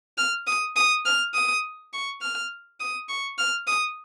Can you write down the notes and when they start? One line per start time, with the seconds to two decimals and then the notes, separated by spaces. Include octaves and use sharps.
0.18 F6
0.47 D#6
0.76 D#6
1.05 F6
1.34 D#6
1.93 C#6
2.22 F6
2.80 D#6
3.09 C#6
3.38 F6
3.67 D#6